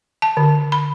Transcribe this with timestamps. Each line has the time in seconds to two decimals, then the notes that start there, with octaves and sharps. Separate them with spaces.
0.22 A5
0.37 D3
0.72 B5